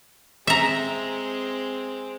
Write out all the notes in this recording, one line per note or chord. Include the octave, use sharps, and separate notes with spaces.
G#3 C4 E5 A#5